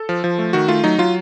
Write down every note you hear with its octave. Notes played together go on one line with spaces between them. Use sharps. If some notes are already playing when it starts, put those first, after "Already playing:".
Already playing: A4
F3
F3
A3
D#3 F#4
A3 F4
F#3 D#4
F#3 F4